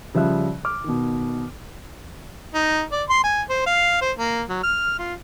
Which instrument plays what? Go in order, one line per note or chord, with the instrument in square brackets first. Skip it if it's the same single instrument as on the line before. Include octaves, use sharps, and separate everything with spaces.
[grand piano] C#3 F3 G3 E5 F#6
D6 F6
B2 D#3
[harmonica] D#4
D5
C6
G#5
C5
F5
C5
A#3
F#3
F6
F4